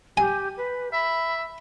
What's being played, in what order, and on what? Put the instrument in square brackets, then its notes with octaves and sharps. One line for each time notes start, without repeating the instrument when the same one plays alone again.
[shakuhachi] G4 [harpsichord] G#5
[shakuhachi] B4
[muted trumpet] E5 [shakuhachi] B5